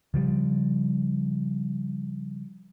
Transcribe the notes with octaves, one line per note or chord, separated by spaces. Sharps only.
C#3 F3 G3